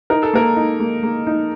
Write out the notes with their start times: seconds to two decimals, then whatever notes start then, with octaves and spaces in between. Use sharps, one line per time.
0.10 D#4 A#4
0.23 A4
0.33 A#3 A#4
0.56 D#4
0.80 A#3
1.03 A#3
1.27 D#4